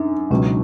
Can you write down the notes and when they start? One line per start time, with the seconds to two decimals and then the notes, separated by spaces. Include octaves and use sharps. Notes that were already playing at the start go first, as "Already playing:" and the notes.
Already playing: F#2 D4 D#4
0.30 C#2 B2 F#3 C#4